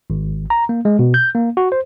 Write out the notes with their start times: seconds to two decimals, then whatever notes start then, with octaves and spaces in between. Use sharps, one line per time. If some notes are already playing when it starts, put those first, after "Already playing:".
0.10 G#1
0.50 A#5
0.69 A#3
0.85 G#3
0.99 B2
1.14 G6
1.35 A#3
1.57 F#4
1.72 C5